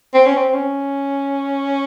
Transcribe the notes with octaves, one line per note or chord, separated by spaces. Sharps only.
C4
C#4
C4
C#4